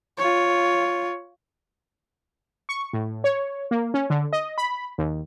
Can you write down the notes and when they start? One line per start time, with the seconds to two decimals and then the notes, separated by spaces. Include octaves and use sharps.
0.18 F4 C#5
2.69 C#6
2.93 A2
3.24 C#5
3.71 A#3
3.94 C#4
4.10 D3
4.33 D#5
4.58 B5
4.98 D#2